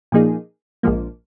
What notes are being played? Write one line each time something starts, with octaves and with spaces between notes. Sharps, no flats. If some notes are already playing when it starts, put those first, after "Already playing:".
A#2 F3 A#3 D#4 G#4
A#1 G#2 F3 A#3